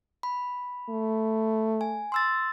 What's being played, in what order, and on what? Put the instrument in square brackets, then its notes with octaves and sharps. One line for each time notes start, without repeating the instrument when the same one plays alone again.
[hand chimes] B5
[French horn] A3
[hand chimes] G#5
C6 E6 A6